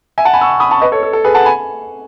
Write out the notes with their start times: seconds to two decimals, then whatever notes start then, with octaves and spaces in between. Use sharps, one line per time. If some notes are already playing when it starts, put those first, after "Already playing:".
0.18 E5 G#5
0.25 F#5 A5
0.33 G#5 B5
0.41 C#6 E6
0.60 B5 D#6
0.71 A5 C#6
0.81 B4 D#5
0.92 A4 C#5
1.03 A4
1.13 A4
1.24 G#4 B4
1.35 F#5 A5
1.46 G#5 B5